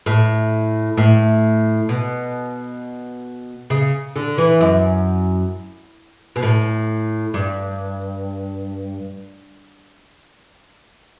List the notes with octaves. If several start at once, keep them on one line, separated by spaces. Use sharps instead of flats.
A2
A2
B2
C#3
D3
E3
F#2
B2
A2
G2